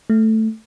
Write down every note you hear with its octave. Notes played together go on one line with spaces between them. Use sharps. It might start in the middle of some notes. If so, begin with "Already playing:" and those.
A3